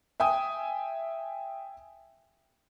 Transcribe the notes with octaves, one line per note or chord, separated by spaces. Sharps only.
E5 G5 G#5 D#6